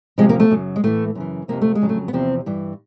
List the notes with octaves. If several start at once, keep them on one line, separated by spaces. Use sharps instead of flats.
E2 C3 F3 G#3
A#3
A3
F#2 C#3 F#3
G#3
A2 E3 A3
F#2 C#3 E3
F2 C3 F3 A#3
A3
G#3
F2 C#3 F#3
A3
B3
E2 C3 F3 C4
G2 E3